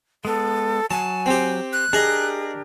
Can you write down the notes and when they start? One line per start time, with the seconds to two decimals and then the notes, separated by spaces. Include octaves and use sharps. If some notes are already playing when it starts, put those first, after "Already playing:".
0.25 G#3 B3 A4
0.91 F#3 F#4 G#5 A5
1.26 C4 G4
1.73 F#6
1.93 D4 G4 G#4 A#4 D#5